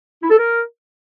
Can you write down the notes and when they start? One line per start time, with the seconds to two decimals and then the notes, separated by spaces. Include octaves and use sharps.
0.22 E4
0.30 A4
0.38 A#4